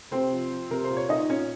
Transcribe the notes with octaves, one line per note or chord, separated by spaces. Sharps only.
C3 C4 C5
F3
F3
C3 A#4
C5
A#2
C#5
A#2 D#4 D#5
A#2 C#4 C#5